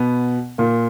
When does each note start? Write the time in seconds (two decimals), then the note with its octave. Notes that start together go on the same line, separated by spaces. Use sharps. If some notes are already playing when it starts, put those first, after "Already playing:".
Already playing: B2 B3
0.58 A#2 A#3